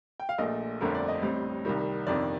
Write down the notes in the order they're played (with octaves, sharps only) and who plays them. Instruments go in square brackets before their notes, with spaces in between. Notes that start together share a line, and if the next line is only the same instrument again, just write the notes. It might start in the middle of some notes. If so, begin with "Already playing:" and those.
[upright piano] G5
F5
A#1 A#2 A3 D#5
G1 F2 D3 A3 C4 A#4
D5
D#5
A1 A2 G3 C4
C2 C3 D#3 G3
G1 F2 C3 D#3 D5